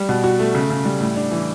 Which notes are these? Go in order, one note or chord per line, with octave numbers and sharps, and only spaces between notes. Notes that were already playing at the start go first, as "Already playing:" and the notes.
Already playing: G3
B2
F#4
A3
C#3
C#3
G3
A2
D4
E3